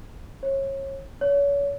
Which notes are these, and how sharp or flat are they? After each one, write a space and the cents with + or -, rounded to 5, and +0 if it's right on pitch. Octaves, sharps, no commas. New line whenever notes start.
C#5 -30
C#5 +35